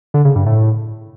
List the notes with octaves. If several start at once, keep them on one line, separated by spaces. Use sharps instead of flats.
D3
C#3
G2
A2